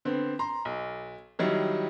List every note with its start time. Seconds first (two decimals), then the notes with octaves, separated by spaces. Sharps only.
0.05 D3 B3 C4
0.39 A#5 C6
0.65 B1
1.39 D#3 F#3 G3 E4